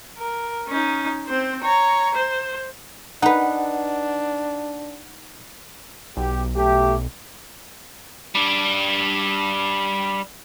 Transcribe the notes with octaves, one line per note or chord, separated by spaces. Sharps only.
A#4
C#4 D#4
C4 C5
C#5 A#5
C5
D4 D#4 B4 F#5
B1 G4
A3 G4
G3 D4